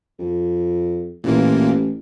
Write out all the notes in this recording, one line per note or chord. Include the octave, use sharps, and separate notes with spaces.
F2
A1 A#2 E3 A#3